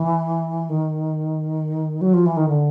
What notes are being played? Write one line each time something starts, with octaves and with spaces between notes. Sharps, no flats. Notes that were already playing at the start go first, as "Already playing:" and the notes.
Already playing: E3
D#3
F#3
F3
E3
D#3
D3